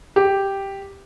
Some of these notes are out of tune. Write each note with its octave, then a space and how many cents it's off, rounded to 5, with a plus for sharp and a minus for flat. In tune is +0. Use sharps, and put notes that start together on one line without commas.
G4 +0